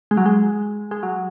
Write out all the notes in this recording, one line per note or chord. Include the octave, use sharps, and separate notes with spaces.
G#3
F#3
G#3
G#3
F#3